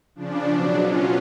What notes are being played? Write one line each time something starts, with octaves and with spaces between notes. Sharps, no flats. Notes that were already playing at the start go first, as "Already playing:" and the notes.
C#3 F3 D4
B2 F#3
B2 F#3 C#4 F4